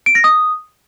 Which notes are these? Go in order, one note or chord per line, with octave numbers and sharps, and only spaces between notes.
D7
A#6
D#6